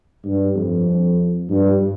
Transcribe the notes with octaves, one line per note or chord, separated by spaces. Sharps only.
G2
F2
G2